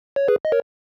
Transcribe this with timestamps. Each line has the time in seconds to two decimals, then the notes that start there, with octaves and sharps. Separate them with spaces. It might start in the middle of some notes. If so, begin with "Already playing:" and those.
0.16 C#5
0.28 G#4 B4
0.45 D#5
0.52 A#4 C#5